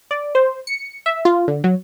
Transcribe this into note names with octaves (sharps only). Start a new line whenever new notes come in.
D5
C5
C#7
E5
F4
D3
F#3